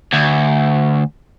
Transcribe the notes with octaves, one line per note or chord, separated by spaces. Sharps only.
D2